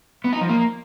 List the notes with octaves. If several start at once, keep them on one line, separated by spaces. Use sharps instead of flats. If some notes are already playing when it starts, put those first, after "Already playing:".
B3
D#4
F3
A#3